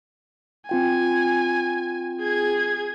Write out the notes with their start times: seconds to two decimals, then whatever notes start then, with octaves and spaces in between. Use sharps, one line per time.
0.69 C4 F4 G5 G#5
2.21 G#4 G#6